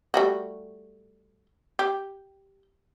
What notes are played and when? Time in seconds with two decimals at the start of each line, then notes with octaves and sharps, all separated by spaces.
0.14 G3 A3 F#4
1.79 G4